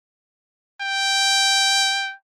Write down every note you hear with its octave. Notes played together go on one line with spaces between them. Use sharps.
G5